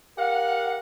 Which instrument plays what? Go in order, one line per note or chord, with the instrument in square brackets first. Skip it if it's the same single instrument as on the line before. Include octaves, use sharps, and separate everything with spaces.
[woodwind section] G4 A#4 F#5 [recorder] F5